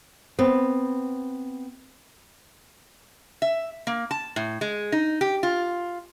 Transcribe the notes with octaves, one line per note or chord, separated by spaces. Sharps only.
B3 C4
E5
A#3
A5
A2
G#3
D#4
G4
F4